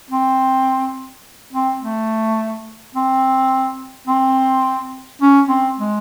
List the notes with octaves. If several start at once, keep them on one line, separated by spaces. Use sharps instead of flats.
C4
C4
A3
C4
C4
C#4
C4
G#3